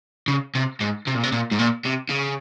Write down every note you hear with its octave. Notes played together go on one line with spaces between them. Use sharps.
C#3
C3
G#2
C3
A#2
C3
A#2
G#2
A#2
C3
C#3